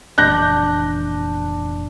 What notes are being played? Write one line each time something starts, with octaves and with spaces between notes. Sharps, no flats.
F1 A#2 E3 D4 F#6 G6 A#6